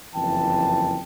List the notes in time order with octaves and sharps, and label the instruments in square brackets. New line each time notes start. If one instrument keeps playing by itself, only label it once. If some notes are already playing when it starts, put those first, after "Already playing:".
[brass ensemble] F#1 F2 E3 G5 A5